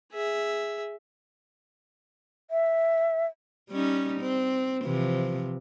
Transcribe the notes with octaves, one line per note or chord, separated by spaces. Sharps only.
G#4 E5
E5
G3 C#4 D#4
C4
C3 E3 F3